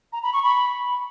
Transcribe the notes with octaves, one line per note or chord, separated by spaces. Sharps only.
A#5
B5
C#6
B5